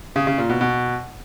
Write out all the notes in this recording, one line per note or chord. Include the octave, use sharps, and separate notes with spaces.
C#3
C#3
A#2
B2
B2